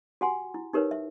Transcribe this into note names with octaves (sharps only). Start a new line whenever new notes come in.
F#4 G4 F#5 G#5 C6
E4
D#4 G4 A#4 B4 C#5
E5